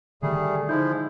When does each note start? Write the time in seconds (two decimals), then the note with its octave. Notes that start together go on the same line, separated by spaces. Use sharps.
0.22 A#2 D3 D#3 G3 A3 G#4
0.69 F3 G#3 D#4 E4 G6